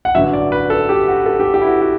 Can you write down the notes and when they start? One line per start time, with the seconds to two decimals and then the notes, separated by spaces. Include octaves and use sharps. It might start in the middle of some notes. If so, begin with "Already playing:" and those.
0.05 F#5
0.15 A1 G2 D3 F#3 E5
0.33 D5
0.52 B4
0.70 A4
0.89 G4
1.08 F#4
1.26 A4
1.40 G4
1.54 G4
1.62 E4
1.67 F#4
1.82 F#4